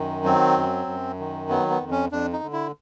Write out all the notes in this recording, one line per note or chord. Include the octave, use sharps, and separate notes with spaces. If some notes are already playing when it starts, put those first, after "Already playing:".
Already playing: F#2 D#3
F#3 C4
F#2
F#2
D#3
F#3 B3
B3
F2
C#4
F2 D4
D#4
D3
E4